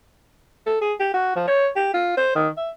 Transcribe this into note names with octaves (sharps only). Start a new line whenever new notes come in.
A4
G#4
G4
F#4
F3
C#5
G4
F4
C5
D#3
E5